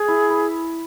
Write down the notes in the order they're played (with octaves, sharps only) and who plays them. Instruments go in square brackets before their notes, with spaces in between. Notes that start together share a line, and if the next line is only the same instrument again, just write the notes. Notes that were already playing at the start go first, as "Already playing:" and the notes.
Already playing: [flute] G#4
[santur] E4
B4